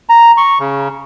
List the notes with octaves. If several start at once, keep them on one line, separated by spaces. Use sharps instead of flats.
A#5
C#6
C#3